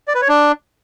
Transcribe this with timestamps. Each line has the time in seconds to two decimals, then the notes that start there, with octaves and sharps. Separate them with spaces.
0.08 D5
0.15 B4
0.22 C#5
0.28 D4